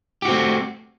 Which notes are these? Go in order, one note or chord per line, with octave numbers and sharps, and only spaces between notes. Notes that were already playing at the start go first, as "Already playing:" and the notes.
A3 C4 F#4 G4